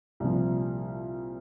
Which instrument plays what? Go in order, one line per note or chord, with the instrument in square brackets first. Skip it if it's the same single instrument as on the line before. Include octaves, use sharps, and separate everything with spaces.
[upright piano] C2 A#2 F3